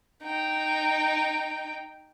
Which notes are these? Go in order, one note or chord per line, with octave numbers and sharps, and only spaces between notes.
D#4 G5